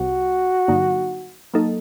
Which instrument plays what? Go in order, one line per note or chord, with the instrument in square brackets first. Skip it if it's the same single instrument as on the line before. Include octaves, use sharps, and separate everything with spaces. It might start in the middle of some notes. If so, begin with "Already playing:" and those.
Already playing: [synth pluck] C2 C3 G3 [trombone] F#4
[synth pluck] G2 D3 F#3 A#3 D#4
F#3 A#3 D#4 A4 D#5